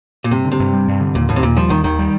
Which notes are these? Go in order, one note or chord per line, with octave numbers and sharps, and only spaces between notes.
A#2
G2 C3
D3
C3
G2
G3
G2
D3
D#2 A#2
D#2 A2
C3
D#2 A#2
F3 G3
D#2 D#3
D#2 D#3
G3